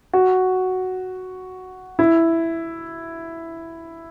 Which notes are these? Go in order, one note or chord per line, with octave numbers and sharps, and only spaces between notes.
F#4
E4